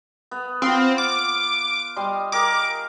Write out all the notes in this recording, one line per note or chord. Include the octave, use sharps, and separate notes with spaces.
B3
C4 F4 F5
D6
G3 D#5 C6
G4 G#4 A#4 D6